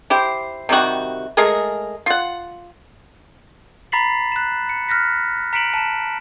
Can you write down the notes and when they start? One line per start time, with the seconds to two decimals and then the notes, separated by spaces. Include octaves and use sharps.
0.10 E4 G4 C5
0.69 C3 D#3 G3 F#4
1.37 G#3 A3 G#4 A#4
2.06 F4 F#5
3.92 A#5 B5 A6 B6 C7 F#7
4.32 F#6 E7
4.69 C#7
4.88 F6 F#6 A#6 B6
5.53 A#5 B6 C#7 D7 E7 F#7
5.74 A5 E7